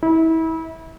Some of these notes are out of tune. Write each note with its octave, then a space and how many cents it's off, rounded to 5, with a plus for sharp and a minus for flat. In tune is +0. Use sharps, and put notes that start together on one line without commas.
E4 -30